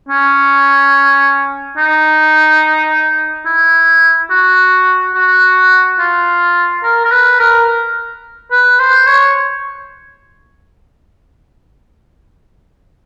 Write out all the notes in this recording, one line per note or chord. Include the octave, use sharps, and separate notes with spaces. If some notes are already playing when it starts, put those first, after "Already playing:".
C#4
D#4
E4
F#4
F#4
F4
A#4
A#4
B4
A#4
B4
C5
C#5